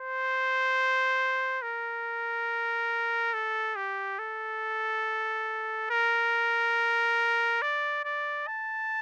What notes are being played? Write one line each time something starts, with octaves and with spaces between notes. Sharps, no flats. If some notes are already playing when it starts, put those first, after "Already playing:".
Already playing: C5
A#4
A4
G4
A4
A#4
D5
D5
A5